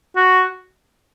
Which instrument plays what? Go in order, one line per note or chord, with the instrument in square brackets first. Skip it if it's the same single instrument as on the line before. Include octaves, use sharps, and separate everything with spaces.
[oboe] F#4